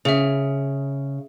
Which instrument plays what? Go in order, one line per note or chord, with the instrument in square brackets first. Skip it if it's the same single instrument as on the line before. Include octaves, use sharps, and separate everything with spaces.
[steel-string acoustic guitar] C#3 [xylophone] G#4 E5